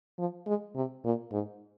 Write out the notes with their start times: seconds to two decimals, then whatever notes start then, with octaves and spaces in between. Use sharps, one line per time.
0.19 F3
0.47 G#3
0.76 C3
1.04 A#2
1.32 G#2